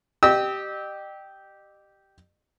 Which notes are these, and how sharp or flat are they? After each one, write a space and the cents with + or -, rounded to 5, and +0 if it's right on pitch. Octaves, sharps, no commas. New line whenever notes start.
G4 -10 D#5 -40 E6 -30